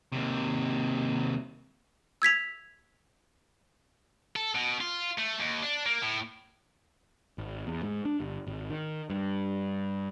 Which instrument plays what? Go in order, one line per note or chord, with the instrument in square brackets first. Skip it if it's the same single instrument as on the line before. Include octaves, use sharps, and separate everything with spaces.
[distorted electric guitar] D#2 C3
[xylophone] E6 G#6 B6 F7
[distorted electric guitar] A4
B2
F4
A3
D#2
D4
A#3
A2
[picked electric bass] G#1
E2
G#2
D4
G1
G#1
D#3
G2